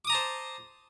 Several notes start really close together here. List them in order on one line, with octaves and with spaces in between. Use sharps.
D6 D#6 A#5 A5 C5